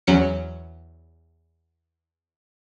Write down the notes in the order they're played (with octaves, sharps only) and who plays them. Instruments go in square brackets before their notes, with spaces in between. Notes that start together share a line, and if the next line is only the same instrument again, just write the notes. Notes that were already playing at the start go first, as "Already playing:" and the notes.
[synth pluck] E2 F#3 C#4 C#7